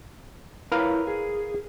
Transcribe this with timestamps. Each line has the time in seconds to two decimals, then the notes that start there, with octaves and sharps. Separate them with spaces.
0.72 E4 F4 A#4 B4 C#5 F5
1.07 G#4